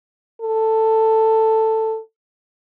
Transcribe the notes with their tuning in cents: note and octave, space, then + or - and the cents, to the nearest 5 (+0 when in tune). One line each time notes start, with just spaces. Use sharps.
A4 +10